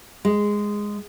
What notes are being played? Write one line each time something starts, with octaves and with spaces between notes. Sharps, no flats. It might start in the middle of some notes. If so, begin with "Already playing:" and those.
G#3